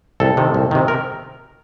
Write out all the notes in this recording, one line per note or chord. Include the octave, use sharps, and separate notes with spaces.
C2 A4
C3 D#3
C2
C3 D#3
A#4